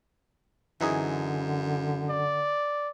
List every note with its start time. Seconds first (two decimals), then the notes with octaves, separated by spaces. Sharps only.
0.81 F#2 D3 E3 D#4 G#4
2.09 D5